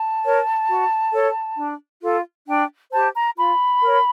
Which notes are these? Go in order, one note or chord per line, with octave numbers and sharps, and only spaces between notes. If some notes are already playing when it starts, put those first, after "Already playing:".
Already playing: A5
A#4 C#5
F#4
A4 C#5
D4
F4 A4
D4 G5
G4 C5 A5
A#5
F4 B5
A#4 C#5